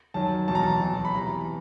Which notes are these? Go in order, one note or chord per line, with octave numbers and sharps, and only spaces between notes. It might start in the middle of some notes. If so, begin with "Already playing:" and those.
F#2 D#3 F#3 A5
E2 B2 F#3 A5
A#5
A5
E2 B2 F#3
B5
E2 C3 E3 A#5